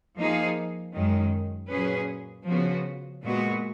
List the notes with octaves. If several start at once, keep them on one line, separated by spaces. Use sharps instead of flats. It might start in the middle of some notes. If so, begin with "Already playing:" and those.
F3 A#3 D#4 G#4
F#2 D#3 G#3
A#2 F#3 C#4 G#4 B4
C#3 F3 B3 F#4
A#2 G#3 B3 F#4